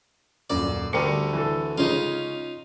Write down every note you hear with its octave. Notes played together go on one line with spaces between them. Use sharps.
D#1 F#2 D5
D2 D3 G3 A#4 C#7
E3 A4
C#3 G#3 C#4 D#4 F4